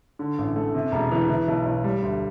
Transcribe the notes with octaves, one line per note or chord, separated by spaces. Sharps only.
D3
A1
A3
C3
E1
E3
E3
B1
B1
G3
D2